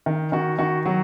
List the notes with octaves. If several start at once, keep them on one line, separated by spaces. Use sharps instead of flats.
D#3
D#3 F#4
D#3 F#4
F#3 F#4